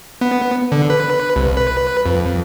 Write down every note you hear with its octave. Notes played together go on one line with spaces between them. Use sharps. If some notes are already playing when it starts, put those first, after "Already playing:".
B3
D3
B4
C2
B4
F2